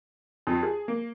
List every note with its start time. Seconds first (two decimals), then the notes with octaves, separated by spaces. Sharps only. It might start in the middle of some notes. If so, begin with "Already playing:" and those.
0.47 F2
0.63 G#4
0.88 A#3